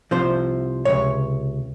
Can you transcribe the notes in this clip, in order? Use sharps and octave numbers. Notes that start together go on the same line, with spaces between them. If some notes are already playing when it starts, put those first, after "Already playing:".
C2 C3 F3 C5
C#2 C3 C#5